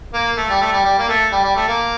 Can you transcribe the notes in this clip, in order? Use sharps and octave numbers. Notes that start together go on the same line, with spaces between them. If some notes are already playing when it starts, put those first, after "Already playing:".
A#3
A3
G3
A3
G3
G3
A#3
A3
G3
G3
A3
A#3